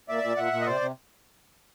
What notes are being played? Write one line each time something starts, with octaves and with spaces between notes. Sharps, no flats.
A#2 D5 E5
A#2
A#2 E5 F#5
A#2
D#5
C3 C5 D5
C3